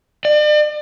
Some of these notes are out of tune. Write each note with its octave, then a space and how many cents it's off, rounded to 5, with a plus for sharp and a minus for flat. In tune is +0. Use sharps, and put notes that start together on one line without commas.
D5 +40